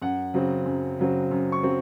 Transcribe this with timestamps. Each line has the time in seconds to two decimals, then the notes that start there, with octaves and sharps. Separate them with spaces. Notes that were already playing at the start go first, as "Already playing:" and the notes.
0.02 F#2 F#5
0.34 C#3 F#3 C4
0.66 F#2
0.99 C#3 F#3 C4
1.31 F#2
1.52 C#6
1.63 C#3 F#3 C4